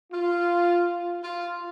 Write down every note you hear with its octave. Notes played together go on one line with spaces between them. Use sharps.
F4
F4